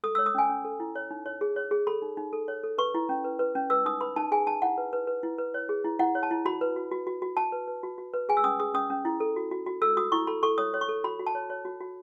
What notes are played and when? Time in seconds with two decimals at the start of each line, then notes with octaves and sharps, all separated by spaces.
0.04 A4 D#6
0.15 E6
0.18 C#5
0.26 D#6
0.35 C#4 G#5
0.49 C#4
0.65 A4
0.80 E4
0.96 C#5
1.11 D#4
1.26 C#5
1.41 G#4
1.56 C#5
1.71 G#4
1.87 A4 B5
2.02 D#4
2.17 D#4
2.33 A4
2.48 C#5
2.63 A4
2.78 B4 C#6
2.94 E4
3.09 C#4
3.24 B4
3.39 B4
3.55 C#4
3.70 B4 E6
3.85 D#4 D#6
4.01 B4 B5
4.16 D#4 A5
4.32 G#4 G#5
4.47 D#4 A5
4.62 E4 F#5
4.78 B4
4.93 B4
5.07 B4
5.23 E4
5.38 B4
5.54 C#5
5.69 G#4
5.84 E4
5.99 E4 F#5
6.15 C#5
6.23 A5
6.31 E4
6.45 F#4 B5
6.61 B4
6.76 F#4
6.92 F#4
7.07 F#4
7.22 F#4
7.37 F#4 A5
7.52 B4
7.68 B4
7.83 F#4
7.98 F#4
8.13 B4
8.29 G#4 G#5
8.37 E6
8.44 C#4 D#6
8.60 G#4 D#6
8.74 C#4 D#6
8.90 C#4
9.05 E4
9.20 A4
9.36 F#4
9.51 F#4
9.66 F#4
9.82 A4 E6
9.97 F#4 D#6
10.12 E4 C#6
10.27 A4 B5
10.43 A4 C#6
10.58 C#5 D#6
10.74 C#5
10.81 C#6
10.89 A4
11.04 F#4 B5
11.19 F#4
11.26 A5
11.35 C#5
11.50 C#5
11.65 F#4
11.81 F#4